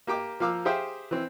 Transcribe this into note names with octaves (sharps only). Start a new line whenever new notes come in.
A#3 G4 G5 D6
F3 A#3 F5 D6 E6
G4 G#4 C5 E5 F5 G5
E3 C4